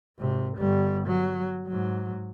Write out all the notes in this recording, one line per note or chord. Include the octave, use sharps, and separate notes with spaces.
G#1 C3
G1 G3
F#3
G#2 F#3